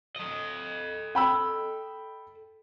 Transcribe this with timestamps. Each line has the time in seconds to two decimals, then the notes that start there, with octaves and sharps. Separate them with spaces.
0.16 A4 D#5
1.15 G5 B5 E6